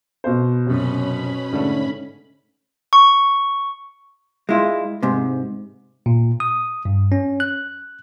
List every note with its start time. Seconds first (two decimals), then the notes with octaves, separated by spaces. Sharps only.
0.24 B2 C5
0.67 F#2 C3 C#4 B5
1.53 G#2 D3 A3
2.93 C#6
4.49 G#3 E4 F4
5.03 G#2 C3
6.06 A#2
6.40 D#6
6.85 G2
7.12 C#4
7.40 F#6